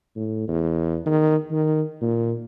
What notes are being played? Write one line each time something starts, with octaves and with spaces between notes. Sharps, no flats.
A2
E2
D#3
D#3
A#2